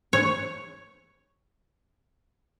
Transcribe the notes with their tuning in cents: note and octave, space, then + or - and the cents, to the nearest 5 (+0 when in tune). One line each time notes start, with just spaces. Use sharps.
C#5 +0